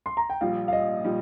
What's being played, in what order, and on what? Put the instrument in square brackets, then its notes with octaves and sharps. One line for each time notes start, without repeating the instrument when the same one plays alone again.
[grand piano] C6
A#5
G5
[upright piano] A#1 A#2 G3 [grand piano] F5
[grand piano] F5
D#5
[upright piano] A#2 G3